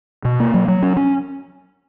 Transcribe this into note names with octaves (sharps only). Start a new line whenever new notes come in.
B2
A#3
F#3
F#3
C#4
C#4